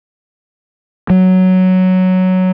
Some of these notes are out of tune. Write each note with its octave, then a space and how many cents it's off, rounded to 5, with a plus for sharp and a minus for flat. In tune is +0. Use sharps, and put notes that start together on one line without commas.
F#3 +5